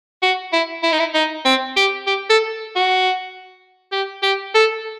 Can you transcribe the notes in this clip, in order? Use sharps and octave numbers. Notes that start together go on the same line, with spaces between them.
F#4
E4
E4
D#4
E4
D#4
C4
G4
G4
A4
F#4
G4
G4
A4